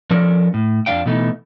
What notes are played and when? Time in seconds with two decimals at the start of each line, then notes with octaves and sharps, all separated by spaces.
0.10 F3 C#4 A4 A#4 D5
0.54 A2
0.86 F2 F3 B3 D4 F5 G5
1.06 B2 E3 A3 D#4